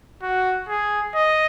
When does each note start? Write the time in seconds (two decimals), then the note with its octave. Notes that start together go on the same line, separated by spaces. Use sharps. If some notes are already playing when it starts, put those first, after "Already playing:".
0.23 F#4
0.69 G#4
1.15 D#5